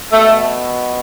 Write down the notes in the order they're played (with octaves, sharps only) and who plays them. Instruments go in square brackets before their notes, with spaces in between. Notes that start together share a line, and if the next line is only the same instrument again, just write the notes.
[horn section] B2 A3